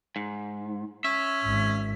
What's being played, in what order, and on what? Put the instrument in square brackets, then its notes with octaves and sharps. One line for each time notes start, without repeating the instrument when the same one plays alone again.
[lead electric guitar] G#2
[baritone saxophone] C#4 [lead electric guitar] E5
[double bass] G#1